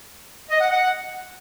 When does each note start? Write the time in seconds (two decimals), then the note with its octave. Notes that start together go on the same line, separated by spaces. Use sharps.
0.50 D#5
0.60 F#5
0.70 F#5